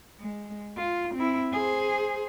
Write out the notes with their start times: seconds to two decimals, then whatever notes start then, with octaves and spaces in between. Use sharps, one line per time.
0.20 G#3
0.77 F4
1.15 C4 E4
1.52 G#4 C5